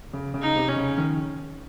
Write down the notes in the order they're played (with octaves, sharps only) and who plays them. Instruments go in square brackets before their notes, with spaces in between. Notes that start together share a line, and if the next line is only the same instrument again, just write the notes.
[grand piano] C#3
C#3
[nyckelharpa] D#4
[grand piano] C3
[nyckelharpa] C#4
[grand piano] C#3
D#3